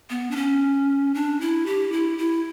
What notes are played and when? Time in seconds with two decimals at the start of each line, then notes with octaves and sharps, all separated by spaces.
0.10 B3
0.31 D4
0.36 C#4
1.14 D4
1.41 E4
1.66 G4
1.92 E4
2.18 E4